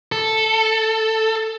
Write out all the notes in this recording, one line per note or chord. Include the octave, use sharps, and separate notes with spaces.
A4